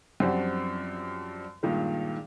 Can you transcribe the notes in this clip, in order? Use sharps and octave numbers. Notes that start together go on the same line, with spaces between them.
F#2 F3 G3 C4 D4 F#4
G2 A#2 D#3 G#3